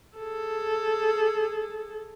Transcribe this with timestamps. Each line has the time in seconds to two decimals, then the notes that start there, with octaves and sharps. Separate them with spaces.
0.18 G#4 A4